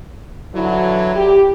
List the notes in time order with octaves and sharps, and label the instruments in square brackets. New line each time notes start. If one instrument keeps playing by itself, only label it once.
[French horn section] D3 E3 F#3 [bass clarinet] E4
[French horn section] G4